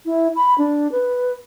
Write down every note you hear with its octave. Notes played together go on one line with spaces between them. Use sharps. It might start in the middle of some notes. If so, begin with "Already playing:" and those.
E4
B5
D4
B4